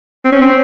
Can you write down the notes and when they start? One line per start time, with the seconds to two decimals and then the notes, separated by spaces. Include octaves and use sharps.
0.25 C4
0.32 C#4
0.41 C4